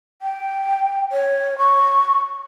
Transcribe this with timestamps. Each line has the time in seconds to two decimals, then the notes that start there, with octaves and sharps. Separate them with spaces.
0.22 G5
1.12 C#5
1.58 C#6